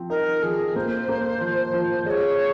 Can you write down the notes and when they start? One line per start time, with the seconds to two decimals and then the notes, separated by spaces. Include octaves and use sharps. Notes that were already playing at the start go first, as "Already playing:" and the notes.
Already playing: F3 C4
0.10 D#4 A#4
0.43 F3 G#4
0.76 A#3 C5
1.09 A#3
1.41 F3
1.74 F3
2.06 G#3 D#5
2.09 C#5